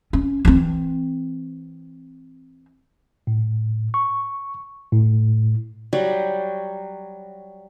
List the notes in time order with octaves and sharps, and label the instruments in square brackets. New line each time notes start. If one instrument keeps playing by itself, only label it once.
[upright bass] C#4
E3 C4
[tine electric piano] A2
C#6
A2
[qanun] F#3 G3 F#4